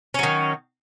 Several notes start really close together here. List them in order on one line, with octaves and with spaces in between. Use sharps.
C#4 F#3 D#3